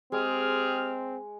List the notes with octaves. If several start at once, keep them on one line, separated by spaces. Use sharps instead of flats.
G#3 C4 G4 G#4 F6